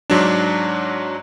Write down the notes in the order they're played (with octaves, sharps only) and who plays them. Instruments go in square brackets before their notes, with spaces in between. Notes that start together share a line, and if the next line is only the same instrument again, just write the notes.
[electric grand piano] G#2 F#3 D4